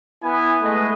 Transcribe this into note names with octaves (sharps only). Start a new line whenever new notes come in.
B3 E4 G#5
G#3 A3 B4 D#5